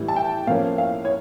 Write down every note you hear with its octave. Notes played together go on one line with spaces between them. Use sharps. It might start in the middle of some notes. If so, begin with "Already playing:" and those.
Already playing: A2 E3 G3
A5
G5
A2 F3 A#3 C#4 F5
F5
C#5